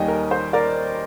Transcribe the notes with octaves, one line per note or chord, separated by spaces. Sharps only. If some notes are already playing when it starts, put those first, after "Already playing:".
Already playing: D#2 D#3 G3 D#5 G5 G#5
A#4
C5
A#4 D5